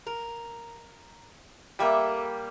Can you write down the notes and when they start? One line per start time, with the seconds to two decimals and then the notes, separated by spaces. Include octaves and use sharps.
0.07 A#4
1.79 G3 A3 A#3 E5